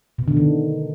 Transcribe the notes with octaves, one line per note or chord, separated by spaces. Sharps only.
B2
D3
D#3